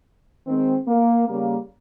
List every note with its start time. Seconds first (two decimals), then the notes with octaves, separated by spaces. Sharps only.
0.46 D#3 G#3 C4
0.87 A#3
1.28 C#3 G3 A#3